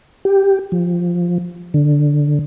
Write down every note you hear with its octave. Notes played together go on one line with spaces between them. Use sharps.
G4
F3
D3